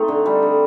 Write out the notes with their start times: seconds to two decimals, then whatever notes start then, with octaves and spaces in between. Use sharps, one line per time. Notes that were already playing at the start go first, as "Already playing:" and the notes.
Already playing: A3 C4 D#4 A4
0.08 D3
0.26 G3
0.43 D3